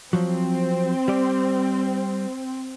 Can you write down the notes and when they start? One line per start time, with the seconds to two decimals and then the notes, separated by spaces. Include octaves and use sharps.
0.13 F3 F#3 C4
1.08 G3 D5